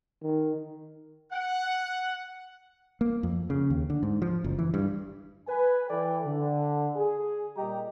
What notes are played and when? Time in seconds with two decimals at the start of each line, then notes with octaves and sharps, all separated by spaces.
0.22 D#3
1.32 F#5
3.01 A#3
3.23 F2
3.50 C#3
3.70 D#2
3.90 D3
4.03 G#2
4.22 F3
4.44 F#1
4.59 E3
4.74 G2
5.48 B4 G#5
5.88 E3 A4 D5 G5
6.24 D3
6.96 G#4
7.57 A#2 G3 G4 D#5 G5 A#5